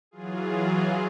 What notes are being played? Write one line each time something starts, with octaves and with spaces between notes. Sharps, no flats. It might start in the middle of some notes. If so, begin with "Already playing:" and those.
E3 F#3 F4 G#4